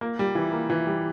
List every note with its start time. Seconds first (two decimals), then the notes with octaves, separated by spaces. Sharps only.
0.01 A#3
0.19 G3
0.35 E3
0.52 A#3
0.70 E3
0.87 G3